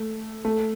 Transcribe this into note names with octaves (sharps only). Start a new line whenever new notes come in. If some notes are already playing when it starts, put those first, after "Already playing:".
Already playing: A3
A3